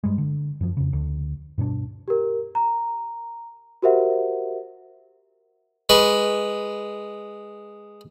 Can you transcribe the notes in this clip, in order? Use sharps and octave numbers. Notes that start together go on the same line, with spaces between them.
G2 G3 G#3
D3
F#2 F3
F2 C#3
D2
G2 B2 B3 D4
G4 A#4
A#5
F#4 G4 A#4 C5 E5 F#5
G#3 B4 C#6